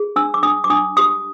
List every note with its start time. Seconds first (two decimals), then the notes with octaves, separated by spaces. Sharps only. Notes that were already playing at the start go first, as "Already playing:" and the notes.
Already playing: G#4
0.16 D4 E6
0.34 D6
0.43 D4 D#6
0.64 D6
0.70 D4 D#6
0.97 G4 D#6